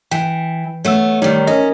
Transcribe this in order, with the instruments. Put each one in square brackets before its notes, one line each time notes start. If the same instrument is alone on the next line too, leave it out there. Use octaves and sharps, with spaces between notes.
[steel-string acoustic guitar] E3 [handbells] G5
[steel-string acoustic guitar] A3 B3 [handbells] C#5 E6
[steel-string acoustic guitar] D#3 G3 [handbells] A3 D#4 C#5
[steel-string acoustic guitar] C#4 [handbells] A#4 D#5